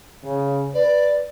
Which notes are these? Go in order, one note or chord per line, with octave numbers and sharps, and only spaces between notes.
C#3
B4 D5